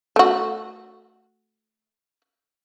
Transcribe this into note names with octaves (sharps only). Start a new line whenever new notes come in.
A3 F#4